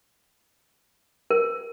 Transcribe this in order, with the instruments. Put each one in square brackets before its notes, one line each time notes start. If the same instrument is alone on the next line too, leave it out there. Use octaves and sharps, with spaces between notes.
[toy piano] A#4